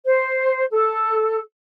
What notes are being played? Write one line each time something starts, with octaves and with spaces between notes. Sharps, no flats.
C5
A4